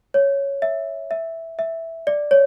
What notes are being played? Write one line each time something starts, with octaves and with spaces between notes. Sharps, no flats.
C#5
E5
E5
E5
D5
C#5